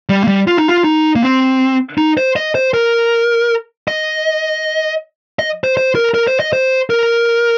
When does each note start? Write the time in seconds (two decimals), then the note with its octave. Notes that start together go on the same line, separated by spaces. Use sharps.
0.09 G3
0.24 A#3
0.27 G3
0.47 F4
0.58 D#4
0.68 F4
0.84 D#4
1.16 A#3
1.22 C4
1.98 D#4
2.17 C5
2.36 D#5
2.55 C5
2.74 A#4
3.88 D#5
5.39 D#5
5.64 C5
5.77 C5
5.95 A#4
6.14 A#4
6.27 C5
6.40 D#5
6.53 C5
6.90 A#4